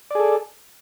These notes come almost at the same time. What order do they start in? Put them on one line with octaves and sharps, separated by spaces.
D5 G#4 A4